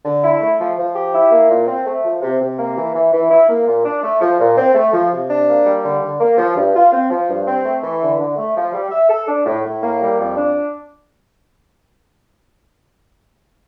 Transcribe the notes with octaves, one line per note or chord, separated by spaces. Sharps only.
D3
E4
A3
F3
F3
G4
E4
A#3
A#2
C4
A3
F3
C3
C3
A#3
E3
E3
E3
E4
A#3
A#2
D4
A3
F3
A#2
C4
A3
F3
C3
D4
A#3
G3
D3
D3
A#3
F3
G2
F4
C4
F3
G2
C4
A3
E3
D3
D3
A3
F3
G3
E5
A4
D4
A2
A2
A#3
G3
F2
D4